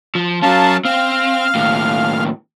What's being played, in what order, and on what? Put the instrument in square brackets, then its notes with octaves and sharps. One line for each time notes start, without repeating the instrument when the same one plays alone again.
[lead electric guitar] F3
[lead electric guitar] F#3 C#4 [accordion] F5 A5
[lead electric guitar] C4 [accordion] F5 F6
[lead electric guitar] D#2 A2